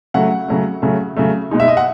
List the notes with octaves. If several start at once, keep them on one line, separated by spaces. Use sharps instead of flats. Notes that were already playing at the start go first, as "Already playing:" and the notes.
C#3 F#3 A3 F#5
C#3 F#3 A3
C#3 F#3 A3
C#3 F#3 A3
B2 G#3 D#4
E5
D#5
F#5